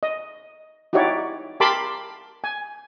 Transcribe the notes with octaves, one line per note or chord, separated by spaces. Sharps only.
D#5
D#4 E4 F#4 G4 C#5 D5
G4 A#4 A5 B5 C6 D6
G#5